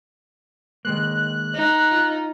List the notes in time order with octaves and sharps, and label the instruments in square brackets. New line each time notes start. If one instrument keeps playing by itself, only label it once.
[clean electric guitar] D#3 G#3 A#3 [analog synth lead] F#6
[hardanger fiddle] D#4
[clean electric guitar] F4